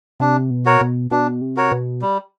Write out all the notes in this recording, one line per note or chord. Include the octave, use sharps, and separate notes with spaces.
C3 D4
B2
F#4 A#4 C#5
B2
B2 D4
C3
F#4 A#4 C#5
B2
G3